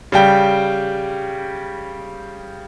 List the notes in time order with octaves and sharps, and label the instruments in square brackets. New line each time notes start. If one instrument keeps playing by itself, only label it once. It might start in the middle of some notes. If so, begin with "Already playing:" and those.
[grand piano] C#3 G3 G5